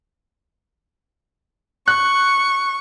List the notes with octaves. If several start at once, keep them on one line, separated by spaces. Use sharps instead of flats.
C#6 F#6